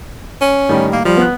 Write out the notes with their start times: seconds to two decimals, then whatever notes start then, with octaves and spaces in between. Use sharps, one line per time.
0.41 C#4
0.69 A2 D#3 G3
0.92 A#3
1.05 F3 G3
1.17 B3 F#6